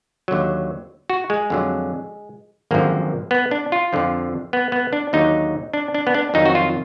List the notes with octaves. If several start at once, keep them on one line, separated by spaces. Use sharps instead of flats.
D#2 D3 F#3
F#4
G#3
F2 D3 F#3
G#1 F#2 D3 F3 A#3
B3
D4
F4
F2 D3 F3
B3
B3
D4
D#2 D3 F#3 D#4
D4
D4
B3
D4
F2 D#3 F#3 D#4
F#4
F4